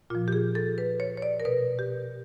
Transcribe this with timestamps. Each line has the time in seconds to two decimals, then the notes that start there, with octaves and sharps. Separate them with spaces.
0.10 A#2 F3 F4
0.28 G4
0.33 G#4
0.55 A4
0.78 B4
1.00 C#5
1.17 C#5
1.22 D5
1.40 A#4
1.45 B2 B4
1.79 G4